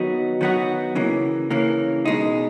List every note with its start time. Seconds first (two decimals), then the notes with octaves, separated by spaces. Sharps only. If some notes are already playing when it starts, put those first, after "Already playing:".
Already playing: D#3 F#3 B3 D#4 F#4
0.41 D#3 F#3 B3 D#4 F#4
0.95 C#3 E3 A#3
1.50 C#3 E3 A#3
2.05 B2 G#3 D#4